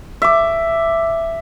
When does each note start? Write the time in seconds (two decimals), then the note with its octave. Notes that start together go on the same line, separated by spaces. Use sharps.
0.22 E5 D6